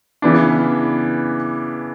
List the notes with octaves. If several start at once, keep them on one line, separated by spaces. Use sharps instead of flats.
C#3 E3 B3 D4